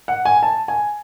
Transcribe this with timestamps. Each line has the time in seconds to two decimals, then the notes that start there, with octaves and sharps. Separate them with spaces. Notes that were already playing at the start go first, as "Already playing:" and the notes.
0.08 F#5
0.25 G#5
0.43 A5
0.68 G#5